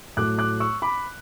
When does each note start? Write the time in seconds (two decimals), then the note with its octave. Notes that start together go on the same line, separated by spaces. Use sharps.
0.17 A2 F#3 A3 D6 F#6
0.38 D6 F#6
0.60 C#6 E6
0.82 B5 D6